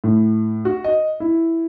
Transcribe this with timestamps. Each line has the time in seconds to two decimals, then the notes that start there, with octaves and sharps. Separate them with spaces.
0.04 A2
0.65 F#4
0.84 D#5
1.20 E4